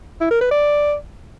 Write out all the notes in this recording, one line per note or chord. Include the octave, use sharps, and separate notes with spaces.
E4
A#4
B4
D5